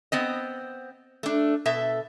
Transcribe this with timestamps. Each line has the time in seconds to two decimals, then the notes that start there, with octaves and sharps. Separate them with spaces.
0.12 B3 C4 D#5
1.23 A3 D4
1.66 B2 A4 E5